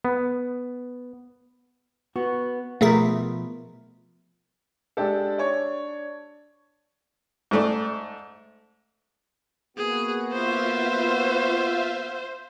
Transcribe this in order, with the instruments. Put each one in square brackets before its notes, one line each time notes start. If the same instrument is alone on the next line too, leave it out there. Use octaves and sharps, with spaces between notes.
[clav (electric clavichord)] B3
[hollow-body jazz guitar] B3 F#4
[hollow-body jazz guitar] B2 F3 A#4 [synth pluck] A3 G#4 E5
[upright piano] G#3 D4 G4 A4
D4 C#5 D5
[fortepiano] G#2 A3 D5
[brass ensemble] A#3 B3 F#4 [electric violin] G#4
[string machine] F4 E5 F5 [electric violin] C5